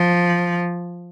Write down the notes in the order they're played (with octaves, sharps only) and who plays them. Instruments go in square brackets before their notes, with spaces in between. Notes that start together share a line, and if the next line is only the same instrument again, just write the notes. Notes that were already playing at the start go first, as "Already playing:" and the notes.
Already playing: [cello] F3